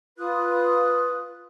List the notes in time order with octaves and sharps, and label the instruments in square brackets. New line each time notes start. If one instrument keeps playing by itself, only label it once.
[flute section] F4 B4 D#6 F#6